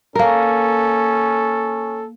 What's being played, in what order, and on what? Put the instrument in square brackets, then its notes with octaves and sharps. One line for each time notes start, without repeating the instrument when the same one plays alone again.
[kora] A#3 A#4 [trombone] C#4 [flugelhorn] A4